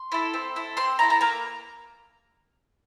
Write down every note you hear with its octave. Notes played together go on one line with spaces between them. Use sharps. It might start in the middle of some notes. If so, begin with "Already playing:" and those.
Already playing: C6
E4 A4
C4
E4 A4
C4 C6
E4 A4 A#5
A#5
A#3 A#5